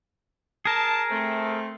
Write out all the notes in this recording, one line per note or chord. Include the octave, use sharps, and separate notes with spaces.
G#4 A#4 A5
A3 C4